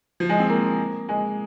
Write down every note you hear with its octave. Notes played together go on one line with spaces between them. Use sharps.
F3
G#3
C4
A#3
G#3